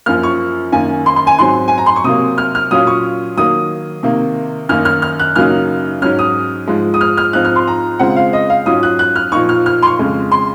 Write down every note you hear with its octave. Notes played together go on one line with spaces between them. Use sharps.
F#2 F3 A#3 F6
C#6
F#2 D#3 A#3 G#5
C6
C6
G#5
G#2 F#3 C4 C6
G#5
A#5
C6
C#6
C3 F#3 A#3 D#6
F6
F6
A#2 F#3 C#4 F4 D#6
C#6
D#3 F#3 A#3 D#6
C3 D#3 A#3
F#2 D#3 A#3 D#4 F6
F6
F6
F#6
F#2 C#3 F#3 A#3 D#4 F6
G#2 F#3 C#4 F6
D#6
G#2 F3 G#3
D#6
F6
F6
G#2 F3 C4 D#4 F#6
F6
C6
A#5
C#3 G#3 C4 F4 F#5
F5
D#5
F5
G#2 F#3 C#4 F4 D#6
F#6
F#6
F6
A#2 F3 A#3 D#4 C#6
F6
F6
C6
C#6
F2 C#3 G#3
C6